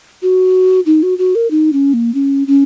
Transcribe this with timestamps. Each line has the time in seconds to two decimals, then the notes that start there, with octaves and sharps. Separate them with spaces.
0.22 F#4
0.86 D#4
1.03 F#4
1.18 F#4
1.35 A#4
1.51 D#4
1.73 C#4
1.94 A#3
2.14 C#4
2.47 C#4